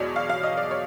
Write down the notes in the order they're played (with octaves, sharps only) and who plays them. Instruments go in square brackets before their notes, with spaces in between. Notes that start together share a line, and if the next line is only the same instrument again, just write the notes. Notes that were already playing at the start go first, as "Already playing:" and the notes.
Already playing: [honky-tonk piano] E2 B2 G#3 C#5 D5
F5
F5
D#5
D5
C#5